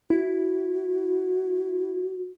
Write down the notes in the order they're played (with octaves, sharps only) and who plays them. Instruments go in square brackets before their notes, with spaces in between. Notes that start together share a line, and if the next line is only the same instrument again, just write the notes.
[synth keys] E4 [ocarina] F#4